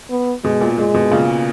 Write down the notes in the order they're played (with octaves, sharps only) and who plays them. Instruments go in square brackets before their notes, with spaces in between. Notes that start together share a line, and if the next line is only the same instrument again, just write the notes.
[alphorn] B3
[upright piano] B2 [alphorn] G#3
[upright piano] A#2
[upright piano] A#2 [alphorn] G#3
[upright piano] B2
A#2 C#3